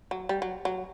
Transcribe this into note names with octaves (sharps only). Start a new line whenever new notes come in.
F#3
G3
F#3
F#3